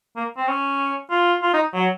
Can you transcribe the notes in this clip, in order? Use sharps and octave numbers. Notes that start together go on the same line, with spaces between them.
A#3
C4
C#4
F4
F4
D#4
F#3